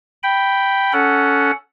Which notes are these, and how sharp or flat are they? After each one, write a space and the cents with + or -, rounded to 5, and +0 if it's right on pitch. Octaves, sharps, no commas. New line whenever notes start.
G5 +0 B5 +0
C#4 +15 A4 +0 F#5 +0